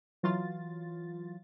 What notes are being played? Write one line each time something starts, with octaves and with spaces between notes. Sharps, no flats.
E3 F#3 F4 A6